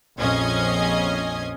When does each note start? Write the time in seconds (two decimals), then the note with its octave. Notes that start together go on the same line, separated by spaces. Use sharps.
0.19 A#1 F2 C#4 D#5 G#6 C7